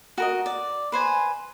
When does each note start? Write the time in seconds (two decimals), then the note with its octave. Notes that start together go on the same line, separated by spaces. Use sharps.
0.18 F#4 A#4 D#5
0.46 D5
0.92 B4 C5 G#5